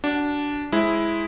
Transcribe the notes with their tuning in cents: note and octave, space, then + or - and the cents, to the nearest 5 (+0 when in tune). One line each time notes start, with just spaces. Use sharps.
D4 -10 F#4 +35 F#5 +5
G#3 +0 E4 +0 C5 +0